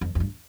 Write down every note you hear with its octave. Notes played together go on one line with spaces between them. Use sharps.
F2
F2
G2